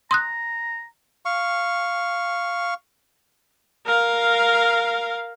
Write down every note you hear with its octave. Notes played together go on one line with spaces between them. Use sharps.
A#5 C6 D#6 F#6
F5 C#6
A#4 F5